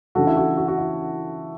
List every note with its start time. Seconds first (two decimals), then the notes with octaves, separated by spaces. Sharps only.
0.15 C#3 E3 A3 D4 F#4 A4
0.27 E4
0.36 F#4
0.57 F#4
0.68 F#4
0.78 E4